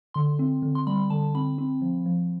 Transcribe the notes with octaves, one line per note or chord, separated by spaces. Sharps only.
D3 C6
C4
D3
C6
G3 B5
D3 A5
C4 B5
C4
F3
F3